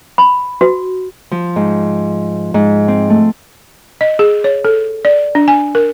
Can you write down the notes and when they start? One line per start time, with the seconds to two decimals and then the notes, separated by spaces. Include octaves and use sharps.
0.18 B5
0.61 F#4
1.31 F3
1.56 G#2
2.54 G#2
2.88 C4
3.10 A3
4.01 D#5
4.19 G#4
4.44 C#5
4.64 A4
5.05 D5
5.35 D4
5.48 G#5
5.75 A#4